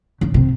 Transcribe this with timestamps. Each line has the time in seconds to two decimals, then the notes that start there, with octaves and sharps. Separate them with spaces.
0.21 C#3
0.34 C3